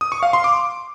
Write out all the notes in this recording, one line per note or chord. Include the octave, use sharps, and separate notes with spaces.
D#6
C#6
F5
C6
D6